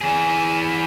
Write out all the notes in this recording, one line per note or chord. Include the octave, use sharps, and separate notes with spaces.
E3 G#4